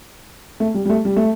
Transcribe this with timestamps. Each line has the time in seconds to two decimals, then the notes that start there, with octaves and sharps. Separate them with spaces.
0.60 A3
0.74 G3
0.85 G3
0.90 A3
1.05 G3
1.16 A3